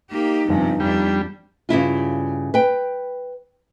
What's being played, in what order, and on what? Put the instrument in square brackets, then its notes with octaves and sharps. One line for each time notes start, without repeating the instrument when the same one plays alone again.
[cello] A#3 G4 [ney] D#4
[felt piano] G1 G2 G#5 [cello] C3 F3
[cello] F2 D4 [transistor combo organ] G3
[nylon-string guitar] G2 C#3 E4 F4
B4 G5